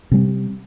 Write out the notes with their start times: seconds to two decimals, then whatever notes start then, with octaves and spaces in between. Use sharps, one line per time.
0.12 C3 G3 C4